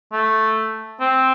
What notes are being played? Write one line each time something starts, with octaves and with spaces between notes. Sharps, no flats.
A3
C4